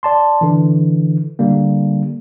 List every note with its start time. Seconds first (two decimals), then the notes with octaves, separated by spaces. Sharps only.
0.03 D5 A5 C6
0.41 D3 E3
1.39 D3 G3 A#3